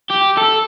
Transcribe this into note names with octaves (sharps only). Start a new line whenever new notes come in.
G4
A4